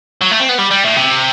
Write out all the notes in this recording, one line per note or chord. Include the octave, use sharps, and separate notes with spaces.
F#3
A3
C4
B3
G3
G3
A2
C3